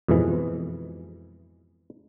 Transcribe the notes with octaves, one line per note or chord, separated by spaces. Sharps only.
F2 G#2 B2 E3